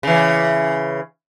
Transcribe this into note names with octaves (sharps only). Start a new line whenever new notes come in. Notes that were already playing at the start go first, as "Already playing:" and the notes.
C#3 E3